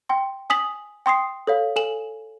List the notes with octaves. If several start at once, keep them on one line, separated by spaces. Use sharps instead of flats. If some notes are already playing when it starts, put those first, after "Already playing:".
G5 C6
G#5 D#6 B6 F#7
G5 C6 D#6 C7
A4 C#5 F5
A4 G#5 E7 F#7